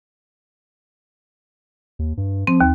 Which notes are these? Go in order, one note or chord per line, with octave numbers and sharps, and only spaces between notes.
D#2
G2
F3 C4
D#2